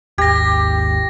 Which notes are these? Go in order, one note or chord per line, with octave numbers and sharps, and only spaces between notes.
G#1 D#2 G4 G#6 A#6